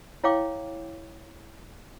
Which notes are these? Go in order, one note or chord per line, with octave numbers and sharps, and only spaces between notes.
E4 C#5 F5 G5 D6